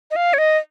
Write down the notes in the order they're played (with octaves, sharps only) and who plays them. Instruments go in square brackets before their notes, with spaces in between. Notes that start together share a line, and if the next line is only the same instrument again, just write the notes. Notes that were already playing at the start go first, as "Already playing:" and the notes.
[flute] D#5
F5
C#5
D#5